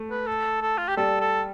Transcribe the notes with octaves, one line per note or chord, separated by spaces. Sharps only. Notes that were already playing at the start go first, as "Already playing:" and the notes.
Already playing: A3
B4
A4
A4
F4
G4
G3 A4
A4